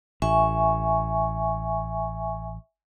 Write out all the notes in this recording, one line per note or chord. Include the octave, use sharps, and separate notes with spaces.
A1 E5 G#5 C#6